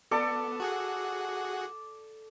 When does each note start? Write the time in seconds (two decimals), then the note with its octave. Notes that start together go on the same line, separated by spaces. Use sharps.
0.11 B3 A4 D5
0.60 F#4 G#4 F#5